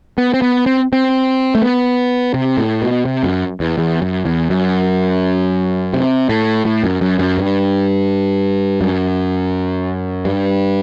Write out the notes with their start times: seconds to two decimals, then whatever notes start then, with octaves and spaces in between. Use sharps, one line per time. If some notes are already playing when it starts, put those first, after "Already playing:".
0.18 B3
0.34 C4
0.42 B3
0.66 C4
0.93 C4
1.55 A3
1.62 B3
2.34 C3
2.57 A2
2.82 B2
3.05 C3
3.23 F#2
3.60 E2
3.78 E2
4.02 F#2
4.25 E2
4.50 F#2
5.94 C3
6.29 A2
6.65 A2
6.84 F#2
7.01 F#2
7.19 F#2
7.38 G2
8.81 F#2
10.25 G2